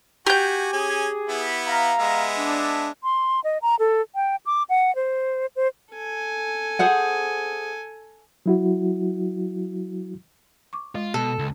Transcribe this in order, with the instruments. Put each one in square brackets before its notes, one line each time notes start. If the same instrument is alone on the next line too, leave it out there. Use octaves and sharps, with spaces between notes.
[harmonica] F#4 G#5 [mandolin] G4 G6
[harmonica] C#4 G#5 [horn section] G#4
[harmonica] B3 E4
[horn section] F5 A#5
[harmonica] G#3 B3 E5
[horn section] D4
[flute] C6
D#5
A#5
A4
G5
D6
F#5
C5
C5
[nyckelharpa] A4 G#5
[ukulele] G#4 C5 F#5
[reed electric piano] F#3 E4 F#4
[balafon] C#6 D6
[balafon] G#3 [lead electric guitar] F4
[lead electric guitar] B2 [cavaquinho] A4
[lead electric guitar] C#2